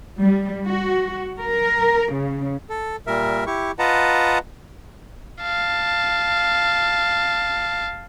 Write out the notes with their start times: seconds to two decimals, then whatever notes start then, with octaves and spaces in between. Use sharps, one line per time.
0.20 G3
0.66 F#4
1.41 A#4
2.11 C#3
2.69 A4
3.07 A#2 G3 A#4 E5
3.47 E4 G4 C#6
3.79 F4 B4 D#5 F#5 A5 A#5
5.42 F5 A5